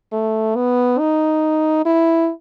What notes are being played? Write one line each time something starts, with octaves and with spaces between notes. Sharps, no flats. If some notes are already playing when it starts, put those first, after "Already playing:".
A3
B3
D#4
E4